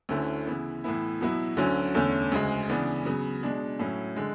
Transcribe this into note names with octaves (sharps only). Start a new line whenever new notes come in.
D2 D3 A3 C#4 E4
C#3 E3 B3 E4
A2 E3 B3 E4
B2 F#3 B3 E4
D2 D3 F#3 C#4
E2 D3 A3 C#4
D2 C#3 G#3
C#3 E3 B3 D4
C#3 F#3 B3
B2 G#3 D4
A2 F#3 C#4 E4
D3 G#3